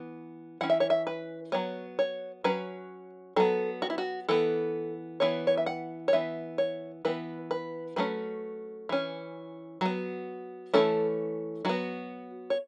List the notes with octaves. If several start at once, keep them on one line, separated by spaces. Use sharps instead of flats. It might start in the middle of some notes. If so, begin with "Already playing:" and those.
Already playing: E3 B3
E3 C#4 F#5
E5
C#5
E5
B4
F#3 B3 C#5
C#5
F#3 C#4 B4
F#3 B3 A4
F#4
E4
F#4
E3 B3 A4
E3 B3 C#5
C#5
E5
F#5
C#5
E3 B3 E5
C#5
E3 B3 B4
B4
F#3 A3 C#4 B4
E3 C#4
F#3 B3
E3 A3 C#4 A4
F#3 B3 F#4
C#5